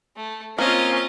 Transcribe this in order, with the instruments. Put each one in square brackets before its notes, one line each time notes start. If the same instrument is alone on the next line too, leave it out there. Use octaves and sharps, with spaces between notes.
[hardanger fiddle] A3
[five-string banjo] A#3 [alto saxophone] C4 [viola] C#4 F4 [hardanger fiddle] D#5 F5